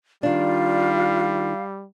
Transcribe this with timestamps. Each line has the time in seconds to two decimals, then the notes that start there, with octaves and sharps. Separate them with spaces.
0.23 D#3 G3 D4 F4 F5